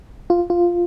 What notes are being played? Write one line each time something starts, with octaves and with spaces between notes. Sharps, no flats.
F4
F4